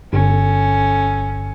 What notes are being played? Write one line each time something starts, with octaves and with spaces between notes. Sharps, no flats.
G1 C#4 A4